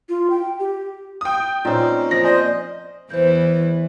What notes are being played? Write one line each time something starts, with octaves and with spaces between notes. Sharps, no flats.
F4
G5
G4
G5 D#6
A#2 C4 C#4 D#4
F3 A#6
C5 D5 D#5 G#5
E2 E3 C5 G6